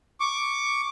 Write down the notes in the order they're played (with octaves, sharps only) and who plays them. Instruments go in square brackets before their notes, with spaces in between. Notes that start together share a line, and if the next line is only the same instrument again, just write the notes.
[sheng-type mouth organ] C#6 D6